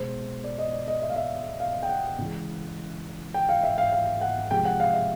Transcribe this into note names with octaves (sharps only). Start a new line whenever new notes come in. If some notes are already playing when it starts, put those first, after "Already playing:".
Already playing: B2 G#3 C5
D5
D#5
D5
D#5
E5
F5
E5
F5
G5
F#5
C#3 E3 G#3
G5
F5
E5
F5
F5
F#5
C3 F3 G#3 G5
F#5
F5
E5